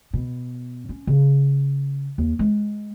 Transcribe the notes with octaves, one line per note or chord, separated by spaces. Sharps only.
B2
C#4
C#3
D#2
G#3